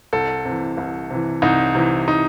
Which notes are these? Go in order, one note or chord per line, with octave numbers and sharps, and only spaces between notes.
C2 A4
C3 E3
C2
C3 E3
C2 D#4
C3 E3
D#4